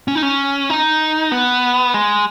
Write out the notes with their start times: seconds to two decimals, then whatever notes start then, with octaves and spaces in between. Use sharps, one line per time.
0.08 C#4
0.15 D#4
0.23 C#4
0.70 D#4
1.32 B3
1.94 G#3